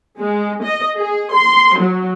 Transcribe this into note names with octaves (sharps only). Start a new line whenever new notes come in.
G#3
D#5
G#4
C6
F#3